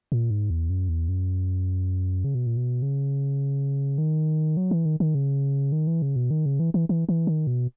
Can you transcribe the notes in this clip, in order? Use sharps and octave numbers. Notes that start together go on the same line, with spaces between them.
A#2
G#2
E2
F#2
E2
F#2
C#3
B2
A#2
B2
C#3
D#3
F#3
E3
D#3
D#3
C#3
D#3
E3
C#3
B2
D#3
C#3
E3
E3
E3
E3
D#3
B2